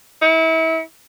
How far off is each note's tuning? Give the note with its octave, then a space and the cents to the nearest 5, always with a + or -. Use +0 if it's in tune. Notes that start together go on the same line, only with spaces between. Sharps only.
E4 -30